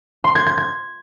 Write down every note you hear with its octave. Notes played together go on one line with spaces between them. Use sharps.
C6
G#6
G#6
G#6